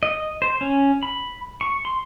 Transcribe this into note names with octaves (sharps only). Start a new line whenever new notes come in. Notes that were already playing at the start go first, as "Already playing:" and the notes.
D#5
C5
C#4
B5
C#6
C6